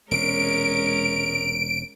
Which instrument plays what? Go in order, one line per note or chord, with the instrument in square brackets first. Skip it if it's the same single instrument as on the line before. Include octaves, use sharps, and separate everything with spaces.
[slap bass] E1 C3 [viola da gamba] G#3 C#4 A#4 [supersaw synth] D7